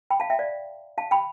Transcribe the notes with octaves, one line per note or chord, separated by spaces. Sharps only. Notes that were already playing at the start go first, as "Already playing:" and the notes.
G5 B5
F5 A5
E5 G5
D5 F5
F5 A5
G5 B5